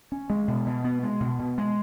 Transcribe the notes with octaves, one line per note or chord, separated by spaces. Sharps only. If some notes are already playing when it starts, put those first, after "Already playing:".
C#4
G#3
B2
B2
B3
G#3
B2
B2
G#3